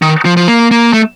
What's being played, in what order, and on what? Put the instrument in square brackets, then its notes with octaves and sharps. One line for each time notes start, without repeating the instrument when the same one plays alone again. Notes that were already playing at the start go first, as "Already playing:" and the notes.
[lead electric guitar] D#3
F3
F3
A#3
A#3
A3